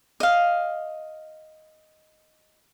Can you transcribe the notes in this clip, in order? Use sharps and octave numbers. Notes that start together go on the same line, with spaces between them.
D#5 F5